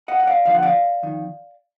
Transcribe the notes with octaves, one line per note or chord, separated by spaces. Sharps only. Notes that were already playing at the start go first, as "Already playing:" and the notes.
D#5 F#5
F#5
D5 F5
D2 D3 F3 F5
F#5
D5 F5
F2 D#3